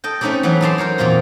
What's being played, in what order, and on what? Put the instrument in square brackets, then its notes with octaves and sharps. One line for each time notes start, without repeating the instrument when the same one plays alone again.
[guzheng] A4 D#5 G5
A3 C4 C#4 D#4 A4 D5
E3 F#3 B3 C#4
D#4 A4 D5 A5 A#5 C6
D#4 A#4 C5 C#5
E2 A#2 C4 F4 A#5